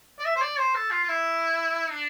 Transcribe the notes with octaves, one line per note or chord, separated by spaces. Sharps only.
D5
E5
C5
D5
C5
A4
F4
F4
E4
D4